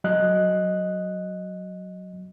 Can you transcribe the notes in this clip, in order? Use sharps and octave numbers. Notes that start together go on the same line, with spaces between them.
F#3 D#5 F#6